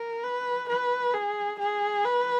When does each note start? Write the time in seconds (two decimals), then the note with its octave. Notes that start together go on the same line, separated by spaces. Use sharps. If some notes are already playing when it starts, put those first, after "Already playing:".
Already playing: A#4
0.23 B4
0.69 B4
1.14 G#4
1.59 G#4
2.05 B4